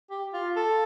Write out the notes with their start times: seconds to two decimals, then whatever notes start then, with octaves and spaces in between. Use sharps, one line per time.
0.10 G4
0.33 F4
0.56 A4